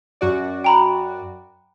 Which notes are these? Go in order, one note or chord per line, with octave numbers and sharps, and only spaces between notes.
F#2 F#4 D5
G5 A#5 B5